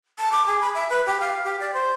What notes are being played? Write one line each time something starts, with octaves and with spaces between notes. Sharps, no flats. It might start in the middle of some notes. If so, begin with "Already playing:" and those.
A5
D6
G#4
B5
E5
B4
G4
F5
G4
D5
C5